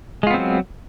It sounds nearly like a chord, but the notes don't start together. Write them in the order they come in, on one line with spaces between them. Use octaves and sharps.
G#3 F4 B3 C4 F#3